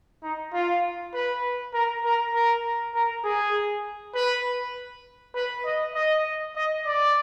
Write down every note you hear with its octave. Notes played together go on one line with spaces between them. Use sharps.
D#4
F4
B4
A#4
A#4
A#4
A#4
G#4
B4
B4
D#5
D#5
D#5
D5